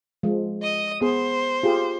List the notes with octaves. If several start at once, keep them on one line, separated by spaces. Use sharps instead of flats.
F3 G#3
D#5 D#6
B3 G#4 C5
F4 G4 G#4